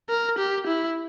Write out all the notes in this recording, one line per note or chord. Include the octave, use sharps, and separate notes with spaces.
A#4
G4
E4